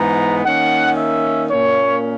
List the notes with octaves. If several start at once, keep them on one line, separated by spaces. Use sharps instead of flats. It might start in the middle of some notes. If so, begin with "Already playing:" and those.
Already playing: G#2 E3 G#3 B3 A#5
D#3 A#3 C#4 F#5
E5
A#2 A#3 C#4 C#5